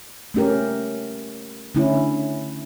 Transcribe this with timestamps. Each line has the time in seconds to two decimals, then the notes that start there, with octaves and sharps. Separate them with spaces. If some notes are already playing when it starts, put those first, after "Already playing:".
0.34 A3 C#4 G4 A#4
1.75 D3 A3 C#4 E4